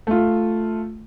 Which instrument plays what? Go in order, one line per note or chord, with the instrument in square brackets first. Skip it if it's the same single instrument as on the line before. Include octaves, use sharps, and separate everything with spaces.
[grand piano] A3 F4